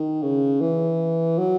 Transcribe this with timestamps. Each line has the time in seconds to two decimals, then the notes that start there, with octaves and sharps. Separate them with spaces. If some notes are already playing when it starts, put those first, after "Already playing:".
Already playing: D#3
0.23 C#3
0.61 E3
1.38 F#3